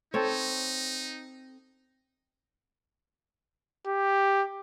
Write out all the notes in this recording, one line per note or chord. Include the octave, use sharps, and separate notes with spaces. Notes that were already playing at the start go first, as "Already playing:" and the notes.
C4 D#4 A4 C#5
G4